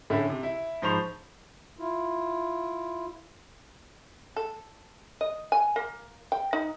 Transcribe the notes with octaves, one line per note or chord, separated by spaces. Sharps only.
A2 D3 A3 C#4 E4
C3
E4
G#2 F3 C5 B5 C#6 F7
E4 F4
A4
D#5
G#5
A#3
G5
D#4